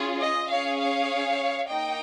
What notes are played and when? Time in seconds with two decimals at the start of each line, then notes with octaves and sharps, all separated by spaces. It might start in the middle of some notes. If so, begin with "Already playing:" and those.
Already playing: C#4 F4 G#4
0.20 D#5
0.49 C#4 G#4 C#5 F5
0.80 C#5 F5
1.69 A#3 D#4 D#5 G5